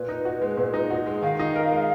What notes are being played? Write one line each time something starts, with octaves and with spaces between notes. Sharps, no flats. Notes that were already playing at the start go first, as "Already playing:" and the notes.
Already playing: A#2 B4
D#4
F#4
G#3
A#2
D#4
F#4
G#3
D#3 F5
D#4
A#4
G#3